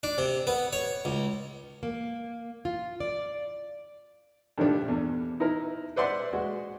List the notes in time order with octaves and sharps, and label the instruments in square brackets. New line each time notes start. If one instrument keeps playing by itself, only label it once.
[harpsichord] D4
C3
B3
C#5
C#2
[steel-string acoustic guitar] A#3
F4
D5
[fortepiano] G2 D#3 F3 A3 D4
E2
D#4 E4 A#4
B4 C5 D5 E5 F#5 C6
G#3 F#4